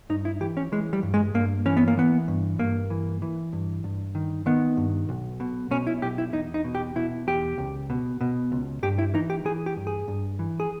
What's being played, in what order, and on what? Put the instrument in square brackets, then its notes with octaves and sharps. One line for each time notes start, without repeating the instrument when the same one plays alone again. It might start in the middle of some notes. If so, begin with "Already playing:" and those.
[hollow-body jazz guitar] G2 D#4
E4
E3 G4
C#4
E3 G#3
G3
G2
G#3
G2 A#3
E3 C#4
B3
A#3
E3 B3
G2
G2 A#3
E3
E3
G2
G2
D#3
D#3 B3
G2
B1
B2
B2 C#4
E4
B1 G4
E4
E2 D#4
D#4
B2
G4
B2 E4
E2 G4
C#2
B2
B2
C#2
G2 G4
E4
E3 D#4
G4
E3 G#4
G4
G2
G#4
G2
E3
G#4